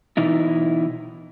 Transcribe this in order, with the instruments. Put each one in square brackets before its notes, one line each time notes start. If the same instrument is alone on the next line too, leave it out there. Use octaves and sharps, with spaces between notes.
[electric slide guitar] B2 E3 D#4 E4